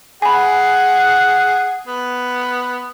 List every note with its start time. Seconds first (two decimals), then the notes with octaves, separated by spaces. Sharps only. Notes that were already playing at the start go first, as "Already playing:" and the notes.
0.22 G#4 F#5 G#5 B5
1.87 B3